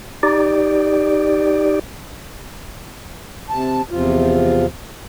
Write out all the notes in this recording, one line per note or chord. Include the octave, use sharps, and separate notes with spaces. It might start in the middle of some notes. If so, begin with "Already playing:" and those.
D#4 G4 D5
C3 A5
E2 C3 F3 F4